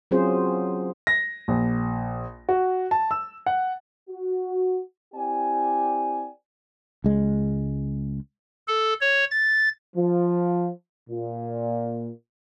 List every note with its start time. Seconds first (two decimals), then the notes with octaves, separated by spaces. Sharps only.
0.11 F#3 C4 C#4 F4 G#4 C5
1.07 A#6
1.48 A#1
2.49 F#4
2.91 A5
3.11 E6
3.46 F#5
4.09 F#4
5.14 C4 E4 G4 D5 G5 G#5
7.04 C#2 G#3
8.67 A4
9.01 C#5
9.31 A6
9.96 F3
11.10 A#2